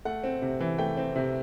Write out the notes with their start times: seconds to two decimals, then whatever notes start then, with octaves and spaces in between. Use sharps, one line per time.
0.05 A3 F#5
0.24 C4
0.42 C3
0.60 E3
0.78 A3 G5
0.97 C4
1.16 C3